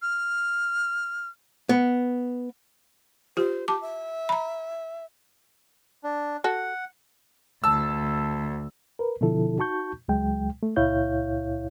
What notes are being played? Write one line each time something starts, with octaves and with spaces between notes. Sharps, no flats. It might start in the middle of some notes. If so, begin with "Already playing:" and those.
F6
B3
F4 G4 C5
G4 A5 D6
E5
A#5 B5
D4
F#4 A4 F#5
D2 A5 E6
A#4 B4
B2 D3 F3 E4 A4
D#4 F#4 A5 C#6 G6
C#2 F#3 G#3 G5
A3
C#2 A#2 E4 C#5 F5 G6